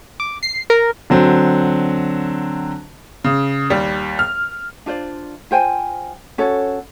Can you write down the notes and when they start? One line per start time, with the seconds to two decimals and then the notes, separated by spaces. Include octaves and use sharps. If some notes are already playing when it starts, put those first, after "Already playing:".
0.20 D6
0.43 C7
0.70 A#4
1.10 D3 F#3 C4
3.24 C#3
3.70 D#2 G3
4.19 F6
4.86 D4 F4 C5 D5
5.51 F4 C5 G5 G#5
6.38 C#4 F#4 A4 C#5